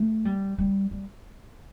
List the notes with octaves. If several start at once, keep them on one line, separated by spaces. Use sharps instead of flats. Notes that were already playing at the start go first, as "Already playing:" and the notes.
Already playing: A3
G3
G3
G3